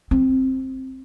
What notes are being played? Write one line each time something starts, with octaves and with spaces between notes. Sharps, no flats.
C4